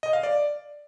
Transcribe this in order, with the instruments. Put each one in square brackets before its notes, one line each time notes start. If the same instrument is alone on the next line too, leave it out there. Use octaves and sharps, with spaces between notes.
[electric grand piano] D#5
F5
D5